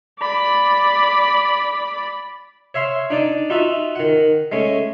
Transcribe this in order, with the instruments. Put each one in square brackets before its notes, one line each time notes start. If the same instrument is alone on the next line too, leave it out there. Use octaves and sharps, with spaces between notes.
[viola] D5 B5
[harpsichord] C#5 E5 F5 C6
D4 D#4 D5
D#4 F4 F#4 E5
D#3 F#5
G#3 A3 C#4